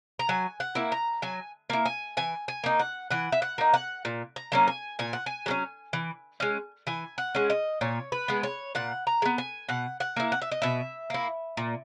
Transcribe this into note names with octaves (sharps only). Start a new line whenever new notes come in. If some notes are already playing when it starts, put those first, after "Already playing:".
A#5
F#3 G#5
F#5
A#3 E4
A#5
F#3 G#5
A#3 E4
G#5
E3 G#5
G#5
A#3 D#4
F#5
E3 F#5
E5
F#5
A#3 D#4
F#5
A#2
A#5
F#3 A#3 C#4
G#5
A#2 G#5
F#5
G#5
F#3 A#3 C#4
E3
G#3 C#4
E3 G#5
F#5
G#3 C#4
D#5
A#2 C#5
B4
G#3 B3
C#5
A#2 F#5
A#5
G#3
B3
G#5
B2 F#5
F#5
A#3 E4
F#5
E5
D#5
B2 E5
A#3 E4
A#2